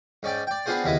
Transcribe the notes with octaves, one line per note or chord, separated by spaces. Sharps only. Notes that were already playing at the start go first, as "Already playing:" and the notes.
G#2 C#4 D5 G5
D5 G5
B3 C4 D4 F4 G#4 C5
D#2 C#3 B3 E4 D#5